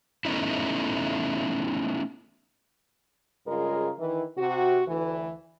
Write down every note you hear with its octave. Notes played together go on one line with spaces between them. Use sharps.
A3 B3 C#4 D#4 E4
G2 C#3 G#3 F4 A#4
D#3 E3
C3 F#4
D2 E3